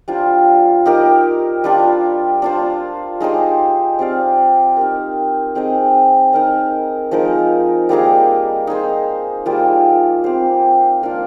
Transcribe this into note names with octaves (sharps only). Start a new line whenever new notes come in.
G3 D4 F4 C5
D#4 G4 A#4 D#5
G3 D4 F4
D4 F4 C5
G#3 D#4 G4 C5
C4 G4 D5 F5
D#4 G4 A#4
C4 D#4 G#4 D#5
D#4 A#4 D#5
F3 G#3 D#4 A#4
G3 A#3 D#4 G#4
D#4 G#4 C5
G3 A#3 F4 G#4
C4 G4 C5
F3 A#3 D4 F4